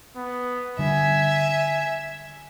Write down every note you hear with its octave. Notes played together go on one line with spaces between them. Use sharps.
B3
D3 G3 E5 G#5